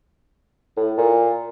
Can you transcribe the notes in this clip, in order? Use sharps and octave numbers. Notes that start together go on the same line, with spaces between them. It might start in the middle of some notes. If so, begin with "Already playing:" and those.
A2
A#2